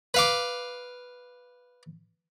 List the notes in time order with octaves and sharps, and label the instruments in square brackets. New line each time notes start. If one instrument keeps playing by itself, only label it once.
[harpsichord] B4 F5 D6